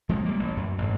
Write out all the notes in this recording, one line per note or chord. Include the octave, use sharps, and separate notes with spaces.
F3 G#3 C4
G3 A#3
A1
F#2
A1 G#2